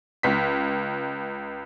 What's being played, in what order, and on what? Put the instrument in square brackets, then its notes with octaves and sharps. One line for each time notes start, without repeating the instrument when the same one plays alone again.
[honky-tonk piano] C#2 B6